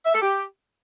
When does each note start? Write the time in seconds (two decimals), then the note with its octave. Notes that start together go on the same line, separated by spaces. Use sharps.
0.05 E5
0.14 A4
0.22 G4